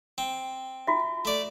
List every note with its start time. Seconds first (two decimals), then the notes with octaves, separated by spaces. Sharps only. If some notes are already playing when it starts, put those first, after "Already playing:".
0.18 C4
0.87 F4 F#4 E5
1.25 A3 D5